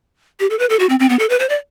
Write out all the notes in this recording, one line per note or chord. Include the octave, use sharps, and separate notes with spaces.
G4
A4
B4
A4
F#4
C4
C4
B3
A4
B4
C5
D5